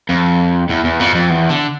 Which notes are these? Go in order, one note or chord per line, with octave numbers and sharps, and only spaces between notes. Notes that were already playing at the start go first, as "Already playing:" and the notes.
F2
E2
E2
F2
F2
E2
D3